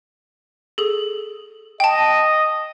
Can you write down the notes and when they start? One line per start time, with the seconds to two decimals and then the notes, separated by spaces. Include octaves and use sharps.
0.78 G#4 A4
1.80 D#5 G5 A5